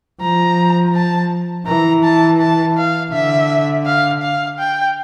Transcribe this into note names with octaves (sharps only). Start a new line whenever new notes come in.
F3 A#5
A5
E3 A#5
A5
A5
F5
D3 E5
F5
F5
G5